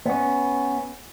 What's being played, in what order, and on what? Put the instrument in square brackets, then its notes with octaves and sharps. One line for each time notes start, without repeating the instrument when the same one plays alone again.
[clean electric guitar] B3 C#4